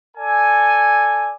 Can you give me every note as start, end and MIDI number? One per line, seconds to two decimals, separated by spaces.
0.17 1.31 69
0.17 1.31 74
0.17 1.31 80